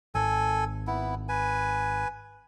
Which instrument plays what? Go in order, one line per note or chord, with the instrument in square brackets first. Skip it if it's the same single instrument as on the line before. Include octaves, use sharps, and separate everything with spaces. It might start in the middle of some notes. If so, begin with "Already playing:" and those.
[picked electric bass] G#1 [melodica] A4 G#5
[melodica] B3 E4
B4 G#5